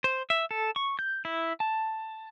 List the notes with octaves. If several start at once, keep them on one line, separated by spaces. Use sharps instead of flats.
C5
E5
A4
C#6
G6
E4
A5